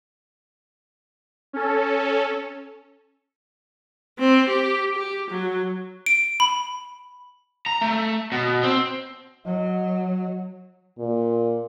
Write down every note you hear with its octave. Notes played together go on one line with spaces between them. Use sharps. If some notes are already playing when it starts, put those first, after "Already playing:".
C#4 A4
C4
G4
G4
F#3
D7
B5
A#5
A3
B2
C4
F#3 D#5
A#2